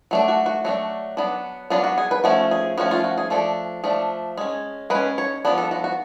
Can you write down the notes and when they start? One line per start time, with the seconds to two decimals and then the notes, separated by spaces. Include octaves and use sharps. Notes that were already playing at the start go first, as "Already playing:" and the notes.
0.11 F#3 A3 D4
0.28 F#4
0.46 F#4
0.64 F#3 A3 D4 F#4
1.17 F#3 B3 D4
1.70 F#3 B3 D4 F4
1.84 F#4
1.98 G#4
2.11 B4
2.24 F3 A3 C#4 F#4
2.51 G#4
2.78 F3 A3 C#4 F#4
2.91 F4
3.04 F#4
3.18 G#4
3.30 F3 A3 D4 A4
3.84 F3 A3 D4
4.38 G#3 C#4
4.90 G#3 C#4 B4
5.18 C#5
5.45 F3 B3 D4
5.58 A4
5.71 F#4
5.84 F#4